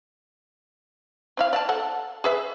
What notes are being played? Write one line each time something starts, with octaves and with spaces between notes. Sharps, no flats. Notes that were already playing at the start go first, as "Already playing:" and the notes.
C4 E4 F5
D5 F5 A5
A4 F#5 A5
G#4 B4 E5